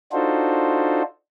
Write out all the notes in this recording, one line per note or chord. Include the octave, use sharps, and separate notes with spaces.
D4 D#4 F4 F#4 A4 C5